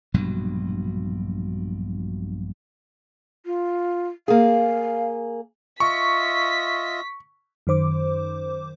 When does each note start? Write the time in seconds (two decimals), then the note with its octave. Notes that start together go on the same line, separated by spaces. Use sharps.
0.14 A#1 G2 B2 F#3
3.46 F4
4.28 A#3 G#4 F5
5.80 F4 D#5 E5 C#6 B6
7.67 F#2 D#3 C5 D6